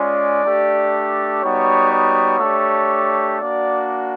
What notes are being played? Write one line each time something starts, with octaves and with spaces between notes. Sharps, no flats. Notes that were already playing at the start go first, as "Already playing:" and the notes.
Already playing: G#3 C#4 F4 D5
A3 D4 G4
G3 B3 D#4 F#4 C#5
C#5
A3 D4 G4
A#3 D4 F#4 D5